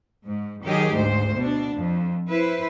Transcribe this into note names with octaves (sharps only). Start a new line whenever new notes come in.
G#2
D#3 F#3 D#4 G4 G#4
D2 G#2 C5
B2 D4
F2
E4 B4 C5